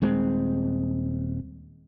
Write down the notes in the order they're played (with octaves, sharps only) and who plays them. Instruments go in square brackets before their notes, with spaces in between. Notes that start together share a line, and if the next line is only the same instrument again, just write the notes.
[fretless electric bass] D#1 G#3 C4